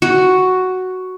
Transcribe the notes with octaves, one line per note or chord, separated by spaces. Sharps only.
F#4